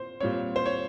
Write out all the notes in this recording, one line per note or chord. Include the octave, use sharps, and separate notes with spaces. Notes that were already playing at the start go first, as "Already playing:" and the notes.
Already playing: A#2 C4 C5
A#2 G3 C4 C#5
C5
C#5